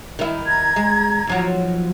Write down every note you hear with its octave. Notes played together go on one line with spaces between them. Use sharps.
D#3 E4
A#5 G#6
G#3
D#2 F3 F#3